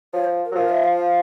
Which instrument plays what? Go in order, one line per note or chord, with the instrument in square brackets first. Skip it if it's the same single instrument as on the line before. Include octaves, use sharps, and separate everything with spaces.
[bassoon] F3 [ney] C#5
[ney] C5
A#4
[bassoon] F#3
[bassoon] F3 [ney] A#4
[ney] E5
F5